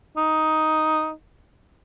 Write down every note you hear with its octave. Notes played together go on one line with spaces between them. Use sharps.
D#4